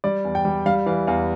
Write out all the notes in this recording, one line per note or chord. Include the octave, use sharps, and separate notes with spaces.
G3 D5
E2
G5
G3
G3 F5
E3 F5
E2 F5